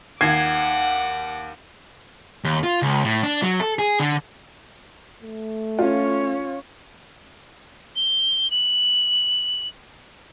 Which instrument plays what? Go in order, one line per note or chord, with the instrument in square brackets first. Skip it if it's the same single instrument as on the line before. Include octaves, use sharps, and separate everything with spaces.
[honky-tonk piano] D#2 G#6 C7 [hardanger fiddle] F#5 D6
[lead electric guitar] D#2
F4
C#2
A2
D4
F#3
A4
G#4
D3
[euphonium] A3
[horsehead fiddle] C#4 C#5 [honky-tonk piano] F4
[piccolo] G7
F#7